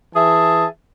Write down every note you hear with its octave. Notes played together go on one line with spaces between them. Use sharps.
E3 G#4 E5 A5